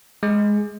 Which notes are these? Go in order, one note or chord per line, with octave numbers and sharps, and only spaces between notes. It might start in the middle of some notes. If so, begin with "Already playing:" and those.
G#3